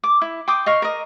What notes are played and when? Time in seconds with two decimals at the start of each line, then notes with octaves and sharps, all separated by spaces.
0.04 D6
0.22 E4
0.48 G5 C6 D6 D#6
0.66 D#5 F5 C#6
0.82 A#4 D#5